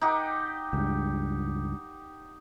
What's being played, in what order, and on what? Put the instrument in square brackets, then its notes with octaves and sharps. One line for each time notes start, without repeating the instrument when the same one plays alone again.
[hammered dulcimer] D#4 G4 F#5
[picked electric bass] C#2 G2